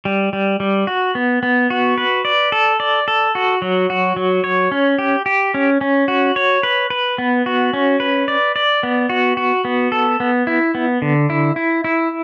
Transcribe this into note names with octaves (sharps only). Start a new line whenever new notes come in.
G3
G3
G3
F#4
B3
B3
F#4
B4
D5
A4
D5
A4
F#4
F#3
F#4
F#3
C#5
C#4
G4
G4
C#4
C#4
F#4
C#5
B4
B4
B3
F#4
C#4
B4
D5
D5
B3
F#4
F#4
B3
A4
B3
E4
B3
D3
E4
E4
E4